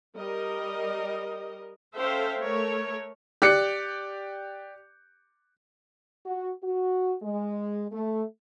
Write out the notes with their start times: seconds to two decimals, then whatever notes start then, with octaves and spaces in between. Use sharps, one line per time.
0.16 G3 A#4 D#5
1.96 C#4 A4 C5 E5 F5 G5
2.40 A3 A#4 C#5
3.42 G4 D5 D6 F#6 C#7
6.25 F#4
6.62 F#4
7.23 G#3
7.92 A3